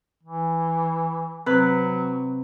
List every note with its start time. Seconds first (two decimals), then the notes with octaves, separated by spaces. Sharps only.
0.23 E3
1.46 C3 F#3 B4 F#6